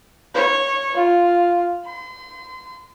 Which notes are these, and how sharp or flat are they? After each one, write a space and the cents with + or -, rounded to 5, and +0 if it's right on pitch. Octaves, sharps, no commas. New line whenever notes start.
C#5 -15
F4 +0
C6 -40